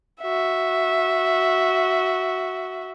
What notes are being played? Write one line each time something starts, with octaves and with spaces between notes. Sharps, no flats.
F#4 E5